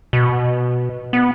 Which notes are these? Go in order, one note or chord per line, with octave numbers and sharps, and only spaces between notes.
B2
B3